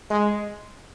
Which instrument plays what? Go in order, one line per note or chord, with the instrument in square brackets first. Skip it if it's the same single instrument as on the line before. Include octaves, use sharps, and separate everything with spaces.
[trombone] G#3